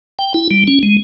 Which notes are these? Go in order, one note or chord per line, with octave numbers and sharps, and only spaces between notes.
G5
E4
G3
C#4
G#3